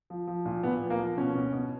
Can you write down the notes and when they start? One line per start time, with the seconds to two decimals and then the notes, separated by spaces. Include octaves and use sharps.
0.10 F3
0.27 F3
0.45 A#2
0.63 A#2 B3
0.82 F3
0.90 A#3
0.99 F3
1.17 B2 C#4
1.35 B2
1.53 B2